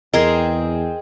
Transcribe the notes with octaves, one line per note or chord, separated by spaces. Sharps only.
E2 C4 G#4 A#4 D#5 C6